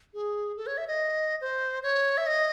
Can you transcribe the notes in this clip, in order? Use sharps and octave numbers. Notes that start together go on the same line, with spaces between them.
G#4
A4
C#5
E5
D#5
C5
C#5
E5
D#5